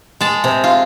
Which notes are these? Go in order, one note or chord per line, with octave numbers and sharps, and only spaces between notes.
G#3 A5
C3
F4